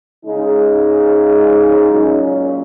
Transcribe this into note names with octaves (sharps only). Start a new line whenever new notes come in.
C#3 G#3 D#4
A#2 F#3 C#4